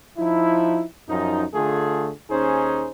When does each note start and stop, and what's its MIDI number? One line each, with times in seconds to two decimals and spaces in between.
0.17 0.85 53
0.17 0.85 63
0.17 0.85 64
1.09 1.44 42
1.09 1.44 53
1.09 1.44 63
1.54 2.12 50
1.54 2.12 57
1.54 2.12 65
1.54 2.12 68
2.31 2.90 39
2.31 2.90 61
2.31 2.90 63
2.31 2.90 68
2.31 2.90 72